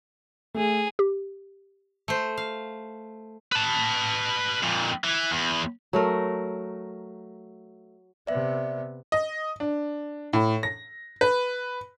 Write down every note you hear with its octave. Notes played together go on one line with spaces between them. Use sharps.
A3 G#4
G4
A3 C5
F5
B4 A5
F2 A#2
E3
E2
F#3 A3 A#4
C3 B3 D5 E5
D#5
D4
A2
A#6
B4